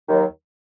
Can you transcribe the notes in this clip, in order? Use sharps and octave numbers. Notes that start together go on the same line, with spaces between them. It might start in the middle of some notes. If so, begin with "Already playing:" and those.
D#2 D#3 F#3